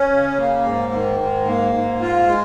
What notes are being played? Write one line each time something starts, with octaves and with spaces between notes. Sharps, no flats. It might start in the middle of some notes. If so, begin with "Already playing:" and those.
Already playing: C#4
C#3
A#3
G#2
D#3
G#2
A#3
G#2
F4
G#3